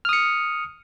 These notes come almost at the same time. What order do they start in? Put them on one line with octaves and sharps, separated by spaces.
F6 D#6 C#7